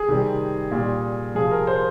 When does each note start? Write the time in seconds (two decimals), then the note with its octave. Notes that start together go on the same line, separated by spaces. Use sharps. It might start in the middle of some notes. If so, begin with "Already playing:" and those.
Already playing: G#4
0.08 C3 D#3 G3
0.71 A#2 G3
1.35 C3 F3 G#4
1.51 A#4
1.67 C5